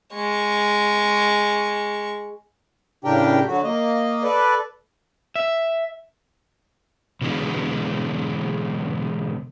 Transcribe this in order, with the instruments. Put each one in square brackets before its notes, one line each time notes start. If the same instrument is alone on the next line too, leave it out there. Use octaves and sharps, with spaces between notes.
[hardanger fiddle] G#3 C#6
[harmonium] A2 C#3 D4 G4 A#4 G5
D3 F#3 F#4
A#3 D#5
A4 B4 D5
[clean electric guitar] E5
[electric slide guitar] B2 D3 E3 F#3 G#3 B3